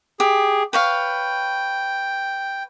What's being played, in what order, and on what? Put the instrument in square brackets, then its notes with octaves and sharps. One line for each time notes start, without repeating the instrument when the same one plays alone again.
[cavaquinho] G4 [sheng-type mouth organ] G#4
[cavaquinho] B4 C#5 F5 [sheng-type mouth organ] G5